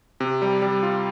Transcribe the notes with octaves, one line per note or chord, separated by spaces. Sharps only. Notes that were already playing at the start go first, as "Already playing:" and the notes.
C3
G3
G3
F4